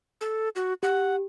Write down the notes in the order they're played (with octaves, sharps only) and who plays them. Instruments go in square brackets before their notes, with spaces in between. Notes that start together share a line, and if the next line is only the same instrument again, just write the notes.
[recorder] A4
F#4
[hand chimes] G4 [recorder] F#5